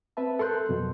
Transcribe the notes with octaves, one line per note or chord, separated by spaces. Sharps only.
C4 B4 E5 A5
A4 A#4 C6 F#6 G6
F2 B2 F#3